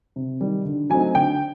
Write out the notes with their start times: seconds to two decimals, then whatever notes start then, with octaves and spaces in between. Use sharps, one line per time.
0.16 C3
0.41 D#3 G3
0.65 D3
0.90 F#3 A3 C4 D#4 G#5
1.15 D3 G5